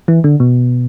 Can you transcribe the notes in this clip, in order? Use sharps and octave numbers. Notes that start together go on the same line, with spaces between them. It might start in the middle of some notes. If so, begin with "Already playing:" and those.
E3
D3
B2